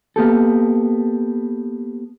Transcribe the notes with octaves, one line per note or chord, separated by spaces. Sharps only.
A#3 B3 G4 A4